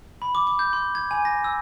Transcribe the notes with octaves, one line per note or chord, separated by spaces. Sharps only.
B5
D6
D6
G6
C6
G#6
G#5
A#6
E6